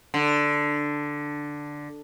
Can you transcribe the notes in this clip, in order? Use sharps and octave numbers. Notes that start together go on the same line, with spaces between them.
D3